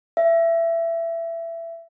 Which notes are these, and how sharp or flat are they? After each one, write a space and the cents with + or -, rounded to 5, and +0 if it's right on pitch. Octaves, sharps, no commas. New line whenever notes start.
E5 +20